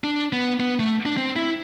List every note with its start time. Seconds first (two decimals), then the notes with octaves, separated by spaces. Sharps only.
0.04 D4
0.32 B3
0.60 B3
0.79 A3
1.05 D4
1.17 C4
1.36 E4